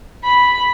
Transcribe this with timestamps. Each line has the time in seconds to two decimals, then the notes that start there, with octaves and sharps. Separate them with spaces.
0.24 B5